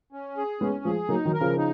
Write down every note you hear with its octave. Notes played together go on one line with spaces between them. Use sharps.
C#4
G#4
G#3 B3 C#4
F3 G#3 G#4
F#3 A#3 D#4
D#3 F#3
A#4
C#3 F3
D#4